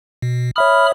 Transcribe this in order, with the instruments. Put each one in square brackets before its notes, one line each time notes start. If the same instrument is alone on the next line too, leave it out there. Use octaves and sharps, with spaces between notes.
[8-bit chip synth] B2
[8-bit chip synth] C#5 E5 D#6 [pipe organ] B5 F6